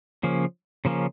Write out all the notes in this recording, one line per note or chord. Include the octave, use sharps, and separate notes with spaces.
C#3 F3 A#3 C#4
C#3 F3 A#3 C#4